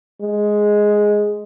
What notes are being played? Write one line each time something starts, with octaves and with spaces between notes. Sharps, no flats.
G#3